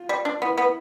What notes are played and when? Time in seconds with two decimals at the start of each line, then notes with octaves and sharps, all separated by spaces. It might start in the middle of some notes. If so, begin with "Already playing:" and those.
Already playing: F4
0.09 G3
0.25 D4
0.41 B3 E4
0.57 B3